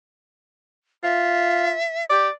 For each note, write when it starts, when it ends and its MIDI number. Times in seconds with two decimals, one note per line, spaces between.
1.03 1.73 65
1.03 2.05 76
2.10 2.29 67
2.10 2.30 74